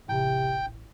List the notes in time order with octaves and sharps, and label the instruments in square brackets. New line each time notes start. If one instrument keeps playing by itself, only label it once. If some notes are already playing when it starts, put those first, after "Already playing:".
[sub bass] D#1 [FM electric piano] A1 [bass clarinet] C3 [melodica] G5